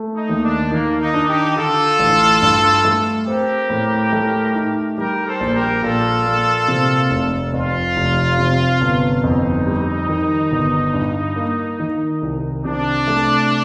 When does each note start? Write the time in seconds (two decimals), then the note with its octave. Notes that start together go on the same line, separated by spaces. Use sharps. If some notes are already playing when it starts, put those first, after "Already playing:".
Already playing: A3
0.14 D#4
0.29 D#2
0.44 D4
0.72 D#3 A#3
1.00 D#4
1.14 D4
1.29 D#4 G4
1.56 D3 F4 A4
1.99 A1
2.42 G2
2.85 A3
3.27 C4 G4 A#4
3.70 A2
4.13 A3
4.55 D#4
4.98 G3 G4 A#4
5.26 A4 C5
5.40 A#1
5.54 G4 A#4
5.82 A#2 F4 A4
6.26 A#3
6.68 C3
7.10 F1
7.53 F2 F4
7.96 F1
8.38 C3
8.81 G1
9.24 F2 D#4
9.66 G3
10.09 D#3
10.52 G1
10.94 G2
11.36 A#3
11.79 D#3
12.22 C2
12.64 C3 D4
13.07 A3